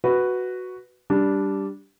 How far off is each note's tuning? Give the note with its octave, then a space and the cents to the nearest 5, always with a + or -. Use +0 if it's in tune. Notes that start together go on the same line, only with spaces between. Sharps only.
F#4 +0 B4 +0
G3 +0 D4 -10